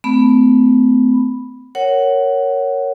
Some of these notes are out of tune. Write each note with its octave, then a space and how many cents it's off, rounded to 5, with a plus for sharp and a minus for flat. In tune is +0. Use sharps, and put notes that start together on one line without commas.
A3 +0 C4 -40 B5 +0
A#4 -10 C#5 +0 F#5 +15